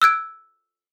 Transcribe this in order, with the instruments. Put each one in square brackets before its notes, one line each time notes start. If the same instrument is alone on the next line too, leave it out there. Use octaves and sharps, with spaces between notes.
[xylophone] E6 F#6 G#6 D7